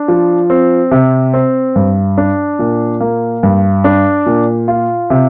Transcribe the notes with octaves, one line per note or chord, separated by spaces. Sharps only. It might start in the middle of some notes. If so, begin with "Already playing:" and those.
Already playing: D4
F3
C4
C3
C4
G2
D4
A#2
A#3
G2
D4
A#2
F4
C3